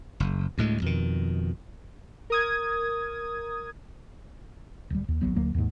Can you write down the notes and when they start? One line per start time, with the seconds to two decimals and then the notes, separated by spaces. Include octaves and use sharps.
0.20 F#1
0.58 D2 A2 G#3
0.82 F2 B2 D#3
2.30 A#4 D#6 G#6
4.90 D1 G3
5.08 D#2
5.22 D1 A#1 F#3 B3
5.36 D2 F#3 A#3
5.55 D#2 G#2